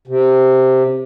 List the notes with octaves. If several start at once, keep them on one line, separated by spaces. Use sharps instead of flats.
C3